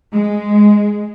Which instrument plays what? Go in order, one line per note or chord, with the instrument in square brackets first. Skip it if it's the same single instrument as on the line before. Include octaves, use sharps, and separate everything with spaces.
[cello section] G#3